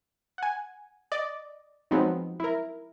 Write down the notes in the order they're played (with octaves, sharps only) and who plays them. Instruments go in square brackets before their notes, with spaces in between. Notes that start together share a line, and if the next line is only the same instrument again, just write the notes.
[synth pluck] F#5 G#5
D5 D#5
F3 F#3 G#3 B3 C4 D#4
E4 A#4